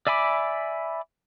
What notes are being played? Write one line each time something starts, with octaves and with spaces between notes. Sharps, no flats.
D5 E5 G#5 B5 D6